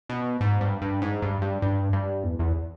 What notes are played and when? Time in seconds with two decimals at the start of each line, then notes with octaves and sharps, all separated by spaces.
0.09 B2
0.41 G#2
0.61 G2
0.82 G2
1.02 G#2
1.22 G2
1.42 G2
1.62 G2
1.93 G2
2.23 E2
2.39 E2